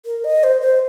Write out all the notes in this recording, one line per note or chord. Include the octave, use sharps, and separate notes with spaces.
A#4
D#5
C5
C5